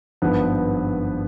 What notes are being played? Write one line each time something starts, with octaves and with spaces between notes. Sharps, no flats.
G#1 G2 F3 B3